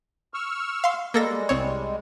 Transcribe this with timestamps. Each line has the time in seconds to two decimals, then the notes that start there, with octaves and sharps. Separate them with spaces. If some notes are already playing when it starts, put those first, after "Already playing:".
0.34 C#6 E6 F6
0.84 F5 C6
1.14 G3 G#3 A#3 A4 A#6
1.49 C2 C4 C#5